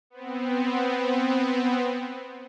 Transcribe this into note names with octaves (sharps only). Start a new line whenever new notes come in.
B3 C4